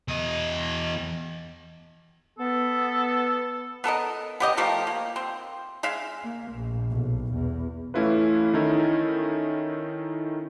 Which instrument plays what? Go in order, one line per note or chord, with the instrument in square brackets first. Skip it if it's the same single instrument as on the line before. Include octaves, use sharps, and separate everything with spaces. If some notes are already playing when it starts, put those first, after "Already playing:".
[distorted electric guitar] E2 D#5
[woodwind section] B3 A4
[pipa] B3 A4 A#4 D#5
B3 G4 D#5
F3 A3 G4 A#4
A#3
C4
G#3 E5 F5
[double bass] A#3
A#1
B1
E2
[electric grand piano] E3 A3 C#4 E4 F4 B4
D#3 C#4 D#4 E4 A4